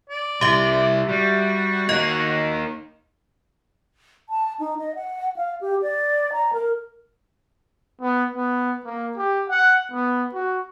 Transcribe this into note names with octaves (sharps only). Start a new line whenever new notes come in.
D5
C2 E4 G4 E5
G3 F#4
A#3 D#4 D#5
A5
D#4
D#5
F#5
F5
G4
D5
A#5
A#4
B3
B3
A#3
G4
F#5
B3
F#4